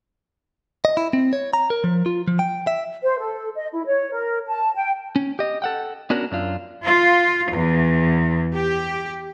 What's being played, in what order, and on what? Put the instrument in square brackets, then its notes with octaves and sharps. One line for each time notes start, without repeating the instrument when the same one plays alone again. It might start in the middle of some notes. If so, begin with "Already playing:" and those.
[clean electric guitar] D#5
E4
C4
C#5
A#5
A#4
F3
F4
F3
G5
E5
[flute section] C5
A4
D#5
E4
C#5
A#4
A5
G5
[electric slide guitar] C#4
G4 D#5
A4 F#5 G5
B3 C#4 D4 F#4 A#4
F#2 D4 F4
[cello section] F4
E2
G4